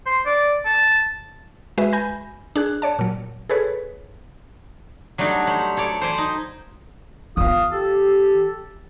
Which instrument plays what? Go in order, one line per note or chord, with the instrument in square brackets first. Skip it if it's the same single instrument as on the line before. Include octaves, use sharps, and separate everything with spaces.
[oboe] C5
D5
A5
[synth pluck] G#3 F#4 B4 E5
G#5 B5 G6 A#6
D4 G#4 F#6
C#5 D5 A5
A#2 F#3
G#4 A4 B4 C#5
[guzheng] F#3 G3 A3 D4 D#4
C5 C#5 B5
A4 C#5 D5
C5 D5 G#5 B5
D#4
[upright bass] D#3 B3 [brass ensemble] F4 F5 [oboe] D#6
[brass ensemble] G4 [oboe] A4